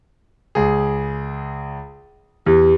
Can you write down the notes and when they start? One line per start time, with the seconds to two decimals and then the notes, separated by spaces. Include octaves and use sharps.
0.55 C#2 G#4
2.46 E2 G4